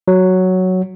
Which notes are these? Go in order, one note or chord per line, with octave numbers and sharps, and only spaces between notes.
F#3